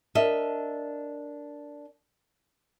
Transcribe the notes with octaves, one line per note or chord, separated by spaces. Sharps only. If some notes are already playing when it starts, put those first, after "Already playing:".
D4 A#4 D#5 E5